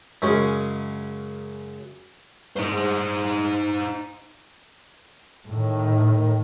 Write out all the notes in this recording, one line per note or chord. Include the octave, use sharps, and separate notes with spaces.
F#2 C#3 G#3 C#4
D#4 C5
A2 D#3